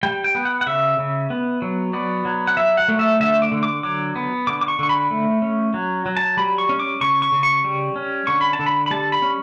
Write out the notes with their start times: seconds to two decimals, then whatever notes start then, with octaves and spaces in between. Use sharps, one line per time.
0.03 G3 G5
0.24 G5
0.35 B3
0.45 F#5
0.61 F#5
0.66 C#3 E5
0.98 C#3
1.30 B3
1.62 F#3
1.93 B3 D5
2.25 F#3
2.47 F#5
2.57 F#3 E5
2.77 F#5
2.88 A3
2.99 E5
3.20 D3 E5
3.42 D6
3.52 D3
3.63 D6
3.83 F#3 D6
4.16 B3
4.47 D3 D6
4.61 D6
4.68 C#6
4.79 D3 C#6
4.89 B5
5.11 A3
5.42 C#4
5.74 F#3
6.06 F#3
6.17 A5
6.37 G3 B5
6.58 C#6
6.69 C#4
6.79 D6
7.01 C#3 C#6
7.22 C#6
7.32 C#3
7.43 C#6
7.64 G3
7.96 C#4
8.27 D3 C#6
8.41 B5
8.53 A5
8.59 D3
8.66 B5
8.86 B5
8.91 G3 A5
9.12 B5
9.22 C#4